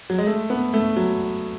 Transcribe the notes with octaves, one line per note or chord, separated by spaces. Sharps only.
F#3
G#3
A3
B3
A3
F#3